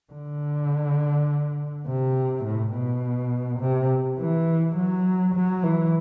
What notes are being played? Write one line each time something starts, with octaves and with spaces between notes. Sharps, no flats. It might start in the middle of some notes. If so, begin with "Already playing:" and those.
D3
C3
A2
B2
C3
E3
F#3
F#3
E3